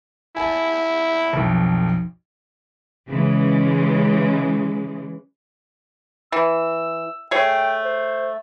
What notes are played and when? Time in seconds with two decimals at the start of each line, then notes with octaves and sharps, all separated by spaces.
0.36 E4 G#5 A5
1.33 B1 F2
3.08 C#3 E3 G#3
6.32 E3 E6
7.31 A3 G#4 C#5 G5
7.84 C5